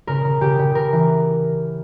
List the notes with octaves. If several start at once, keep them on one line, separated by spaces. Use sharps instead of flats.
C#3 A#4
C#3
C#3 G4
C#3
C#3 A#4
E3